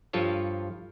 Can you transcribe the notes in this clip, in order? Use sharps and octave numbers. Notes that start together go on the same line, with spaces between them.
G2 F3 F4 A4 C#5